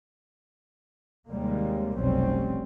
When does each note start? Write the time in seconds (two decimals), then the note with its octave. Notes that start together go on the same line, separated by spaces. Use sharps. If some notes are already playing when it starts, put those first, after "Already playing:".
1.29 D#2 C3 G3 G#3 A#3
1.98 F1 B1 F#3 G3 C4 C#4